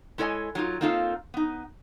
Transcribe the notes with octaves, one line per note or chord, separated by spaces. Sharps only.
G#3 E4 A4 C#5 D#5 G#5
F#3 D#4 F4
A#3 C4 D#4 F4 A4 F5
B3 D#4